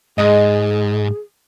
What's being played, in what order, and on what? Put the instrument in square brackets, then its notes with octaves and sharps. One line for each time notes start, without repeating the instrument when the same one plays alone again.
[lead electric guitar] G#2 [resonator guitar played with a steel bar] G#3 D#5 [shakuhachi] G#4